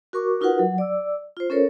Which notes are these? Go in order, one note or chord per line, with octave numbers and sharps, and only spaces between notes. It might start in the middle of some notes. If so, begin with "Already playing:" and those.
F#4 A#4 C#6 D6
D#4 F4 F#4 A#4 B4 F#5
F#3 F#5
D5 D6 E6
F4 C5
C#4 A4 A#4 C#5